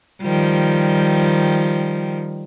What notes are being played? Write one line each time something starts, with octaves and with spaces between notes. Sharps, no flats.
D#3 F3 G3